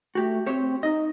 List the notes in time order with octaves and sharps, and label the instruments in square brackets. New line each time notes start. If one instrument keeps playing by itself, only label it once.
[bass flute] A3 [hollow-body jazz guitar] F#4 G4
[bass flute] C4 [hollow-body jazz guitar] G4 C5 C#5
[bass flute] D#4 [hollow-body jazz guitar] D#5